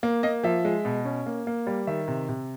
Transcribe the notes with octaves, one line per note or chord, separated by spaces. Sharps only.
A#3
A#3 D#5
F3 E5
G#3
B2
C#4
A#3
A#3
G3
D#3 E5
C3
C3